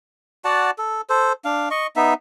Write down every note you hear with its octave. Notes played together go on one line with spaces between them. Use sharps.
F#4 D5 F#5 A5
A4
A4 C5
D4 F5
D#5 C#6
B3 D#4 E5